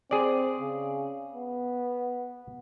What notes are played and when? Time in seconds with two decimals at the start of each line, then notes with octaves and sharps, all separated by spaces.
0.11 C4 G#4 D5
0.59 C#3
1.34 B3